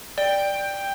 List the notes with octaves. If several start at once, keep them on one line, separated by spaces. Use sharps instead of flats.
D5 G5